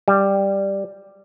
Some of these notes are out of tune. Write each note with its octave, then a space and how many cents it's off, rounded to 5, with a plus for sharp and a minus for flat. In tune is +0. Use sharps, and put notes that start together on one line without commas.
G3 +5